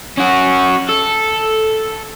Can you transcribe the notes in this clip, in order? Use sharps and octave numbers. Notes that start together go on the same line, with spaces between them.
C#4 F#4
A4